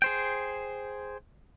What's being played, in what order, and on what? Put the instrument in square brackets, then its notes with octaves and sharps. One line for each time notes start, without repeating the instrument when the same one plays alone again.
[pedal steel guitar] G#4 C5 G5